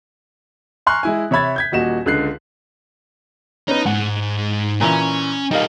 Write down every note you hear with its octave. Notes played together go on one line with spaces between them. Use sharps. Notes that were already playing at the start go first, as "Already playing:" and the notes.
G#5 A#5 C6 C#6 F6 F#6
G#3 E4 G#5
C3 C#5 E5 B5 G#6 A6
G6 G#6 B6
D#1 A#2 F#4 D#5 E7
C#2 D3 F#6 C7
B3 C#4 D#4
G#2 F#5
A#2 E3 C#4
G3 A#3 D#4 D#5 F5